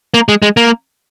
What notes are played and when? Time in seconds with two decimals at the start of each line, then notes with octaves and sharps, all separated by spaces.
0.14 A#3
0.29 G#3
0.42 G#3
0.57 A#3